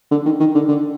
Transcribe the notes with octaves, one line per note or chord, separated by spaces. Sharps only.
D3
D#3
D#3
D3
D3